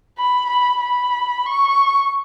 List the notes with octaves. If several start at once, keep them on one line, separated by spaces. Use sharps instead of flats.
B5
B5
B5
C#6